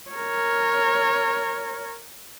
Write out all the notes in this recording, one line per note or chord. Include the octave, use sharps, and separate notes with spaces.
A#4 C#5